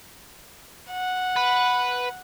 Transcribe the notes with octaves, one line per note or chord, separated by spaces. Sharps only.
F#5
B4